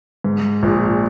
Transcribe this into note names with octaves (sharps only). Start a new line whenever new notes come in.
G#2
A#1 A#2